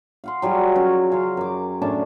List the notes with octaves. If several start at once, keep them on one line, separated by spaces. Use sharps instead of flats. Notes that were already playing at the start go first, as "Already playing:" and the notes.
F5 F#5 C6
F#3 G3 F4 G#4
C#4 A#4 C#5
C#3 F5 A#5 C6
F#2 D6
A2 C#4 D4 A5